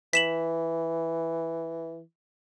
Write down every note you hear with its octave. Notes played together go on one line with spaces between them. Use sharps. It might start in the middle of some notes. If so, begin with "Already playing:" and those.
E3 B6 E7 F#7